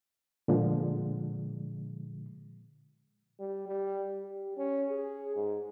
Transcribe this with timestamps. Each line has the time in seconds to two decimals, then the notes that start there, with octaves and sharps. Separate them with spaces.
0.48 A#2 D3 F3 G#3
3.40 G3
3.68 G3
4.23 G4
4.57 C#4
4.90 G#4
5.36 G#2